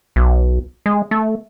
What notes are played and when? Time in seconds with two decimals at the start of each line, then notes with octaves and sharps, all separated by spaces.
0.16 B1
0.86 G#3
1.11 A3